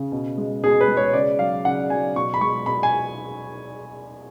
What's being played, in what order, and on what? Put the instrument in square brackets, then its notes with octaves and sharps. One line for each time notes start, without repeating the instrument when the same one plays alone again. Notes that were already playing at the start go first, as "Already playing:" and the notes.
Already playing: [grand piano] C#3
B2
G#3
B2 G#4
B4
G#3
C#5
C#3 D5
F#3 F5
C#3 F#5
F#3 G#5
B2 C#6
B5
G#3 C#6
B2 B5
G#5